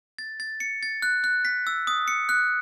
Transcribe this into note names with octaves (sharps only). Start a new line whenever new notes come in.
A6
A6
C#7
A6
F#6
F#6
B6
E6
D#6
C#7
F#6